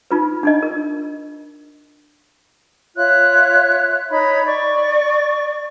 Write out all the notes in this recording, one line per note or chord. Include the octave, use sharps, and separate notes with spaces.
D#4 F4 B4
D4 D#4 D#5
A#4
F4 C#5 E5 F#6
D#4 C#5 B5
D5 C#6